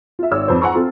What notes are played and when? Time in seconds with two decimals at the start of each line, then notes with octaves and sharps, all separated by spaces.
0.19 F4 E5
0.31 G#1 C#5 E6
0.48 F2 B4 C5
0.62 F#5 G#5 A#5 C6 C#6
0.74 C4 F4 A4